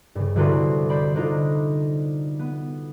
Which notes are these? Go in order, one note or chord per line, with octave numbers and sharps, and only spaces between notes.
G2 C#3
C2 D3 F#4 B4 D5 C6
C5 D5 B5
D3 D4 D#4 F4
B3